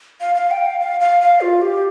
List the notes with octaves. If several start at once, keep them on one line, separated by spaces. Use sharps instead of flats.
F5
F5
G5
F5
F5
F5
F5
F4
G4